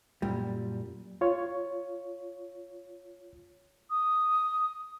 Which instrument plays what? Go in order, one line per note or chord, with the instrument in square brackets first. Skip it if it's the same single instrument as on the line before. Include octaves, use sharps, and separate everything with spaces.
[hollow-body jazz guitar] F#2 A#2 G3
[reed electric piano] F4 C#5
[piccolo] D#6